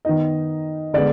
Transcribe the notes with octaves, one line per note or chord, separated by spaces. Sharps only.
D#3 B3 D#4 D#5
D3 G#3 B3 D5